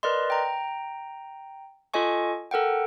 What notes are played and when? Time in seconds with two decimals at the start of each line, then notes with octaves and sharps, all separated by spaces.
0.03 A#4 B4 D5 D#5 C6
0.30 G5 A#5
1.94 F4 A4 D#5 G#5 C#6
2.51 A4 A#4 F#5 G5